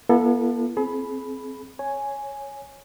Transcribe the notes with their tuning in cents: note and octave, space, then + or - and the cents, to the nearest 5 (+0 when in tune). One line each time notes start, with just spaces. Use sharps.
B3 -40 E4 +45 A4 +0
C4 +0 G#4 +40 B5 +0
C#5 +0 G#5 +0